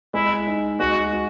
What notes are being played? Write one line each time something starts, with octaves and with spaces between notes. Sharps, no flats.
G#3 E4
D#4
G#3 F#4
F#4